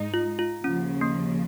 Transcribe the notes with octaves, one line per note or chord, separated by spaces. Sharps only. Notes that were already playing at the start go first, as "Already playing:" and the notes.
Already playing: G#2 G#3 D#4
F4
F4
D#2 C#3 F3 C#4
A#3